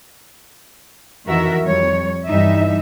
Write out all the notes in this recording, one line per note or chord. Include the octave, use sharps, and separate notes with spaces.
F2 D#3 E3 F#4 A#4 E5
F2 G3 C#5
G2 E3 G3 D#4 E5